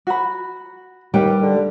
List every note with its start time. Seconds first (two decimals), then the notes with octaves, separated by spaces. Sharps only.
0.07 F#4 B5
1.14 D#2 G3 B4 G5
1.43 D3